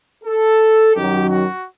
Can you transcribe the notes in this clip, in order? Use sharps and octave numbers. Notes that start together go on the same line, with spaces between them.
A4
F#2 D#3 F#3 G4
F#4